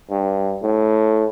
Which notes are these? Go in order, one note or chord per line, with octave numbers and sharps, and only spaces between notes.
G2
A2